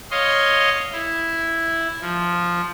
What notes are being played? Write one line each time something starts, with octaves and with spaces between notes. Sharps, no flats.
C#5 D#5 F5 C6
E4
F3